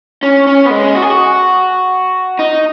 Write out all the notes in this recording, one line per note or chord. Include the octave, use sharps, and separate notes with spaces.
C#4
C#4
B3
G#3
F#4
G#4
F#4
D#4